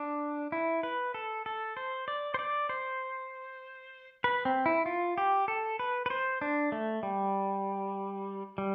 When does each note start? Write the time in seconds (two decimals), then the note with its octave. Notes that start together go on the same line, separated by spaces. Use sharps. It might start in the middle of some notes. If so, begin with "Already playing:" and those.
Already playing: D4
0.52 E4
0.83 B4
1.14 A4
1.46 A4
1.77 C5
2.08 D5
2.34 C5
2.39 D5
2.69 C5
4.24 B4
4.45 C4
4.66 E4
4.86 F4
5.18 G4
5.48 A4
5.79 B4
6.06 B4
6.10 C5
6.41 D4
6.72 A3
7.03 G3
8.58 G3